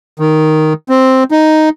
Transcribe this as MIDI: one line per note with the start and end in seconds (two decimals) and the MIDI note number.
0.20 0.73 51
0.89 1.24 60
1.31 1.69 63